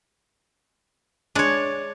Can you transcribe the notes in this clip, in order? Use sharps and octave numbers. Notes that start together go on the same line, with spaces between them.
G#3 D4 C#5 D5